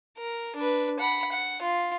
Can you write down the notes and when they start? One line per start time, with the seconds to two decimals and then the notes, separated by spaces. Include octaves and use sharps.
0.18 A#4
0.56 D4 B4
0.99 F#5 B5
1.32 F#5
1.62 F4